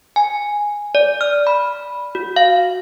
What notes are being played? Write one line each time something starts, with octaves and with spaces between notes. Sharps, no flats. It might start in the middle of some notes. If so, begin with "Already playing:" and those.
G#5
D5
F6
B5
F#4
F5